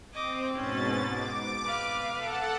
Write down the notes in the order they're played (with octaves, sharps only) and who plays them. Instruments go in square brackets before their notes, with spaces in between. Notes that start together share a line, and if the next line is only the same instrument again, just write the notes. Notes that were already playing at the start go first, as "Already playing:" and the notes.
[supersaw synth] C4 [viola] D#5 D6
[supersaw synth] G#2 B2 A6 [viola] C#4
[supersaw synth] D6
[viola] B4 F5
[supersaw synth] A4 F#5 A5